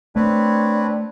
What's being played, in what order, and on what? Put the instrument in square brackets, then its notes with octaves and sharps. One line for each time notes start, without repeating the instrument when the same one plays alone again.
[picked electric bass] A3 [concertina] C4 B4 C#5 [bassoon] D4